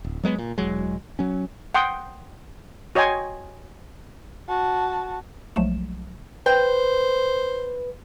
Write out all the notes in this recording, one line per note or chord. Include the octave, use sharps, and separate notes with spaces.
D1
F#3 G#3 A#3 B3
A#2
E1 F#3 G#3
F#3 C#4
F#5 G5 C6 D#6
F#4 C#5 D#5 G5 G#5 C6
F#4 A5
B1 F3 F#3 G#3 A3 E7
B4 C5 G5